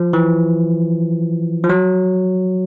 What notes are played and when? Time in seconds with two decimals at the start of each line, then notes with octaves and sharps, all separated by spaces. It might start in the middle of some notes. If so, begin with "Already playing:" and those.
Already playing: F3
0.13 E3
1.64 F3
1.70 F#3